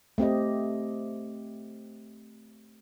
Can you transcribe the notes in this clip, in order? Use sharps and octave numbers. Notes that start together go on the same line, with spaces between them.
A3 C4 G4 D#5